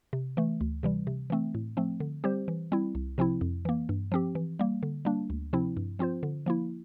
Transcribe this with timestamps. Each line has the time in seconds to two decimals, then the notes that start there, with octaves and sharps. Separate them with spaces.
0.13 C3
0.37 E3 A3
0.61 D2
0.83 C3 E3 G3
1.07 C3
1.30 E3 A3 C4
1.54 A2
1.77 F3 A3 C4
2.00 D3
2.24 G3 C4 G4 C5
2.48 E3
2.72 G3 C4 E4
2.95 C2
3.18 C3 F3 C4 E4
3.41 F2
3.65 E3 A#3
3.89 G2
4.12 F3 C4 G4
4.35 E3
4.59 G3 A#3
4.83 D3
5.05 G3 A#3 D4
5.30 D2
5.53 C3 F3 C4 E4
5.77 G2
5.99 F3 C4 F4 C5
6.23 D3
6.46 F3 A#3 E4